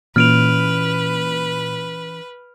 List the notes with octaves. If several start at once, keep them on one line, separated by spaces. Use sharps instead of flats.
A#2 E3 C#4 B4 F6 D7 F7